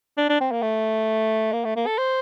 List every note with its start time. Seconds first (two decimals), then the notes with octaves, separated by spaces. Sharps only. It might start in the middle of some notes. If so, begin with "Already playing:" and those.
0.17 D4
0.29 D4
0.40 C4
0.52 A#3
0.62 A3
1.53 A#3
1.64 A3
1.76 A#3
1.87 A4
1.98 C5